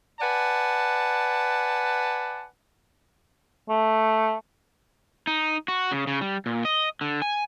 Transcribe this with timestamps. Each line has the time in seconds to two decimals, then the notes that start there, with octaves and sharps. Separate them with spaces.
0.21 B4 D5 F#5 G#5 A5
3.69 A3
5.27 D#4
5.68 F#4
5.91 C#3
6.07 C#3
6.21 G3
6.46 A#2
6.65 D#5
7.01 D3
7.22 G#5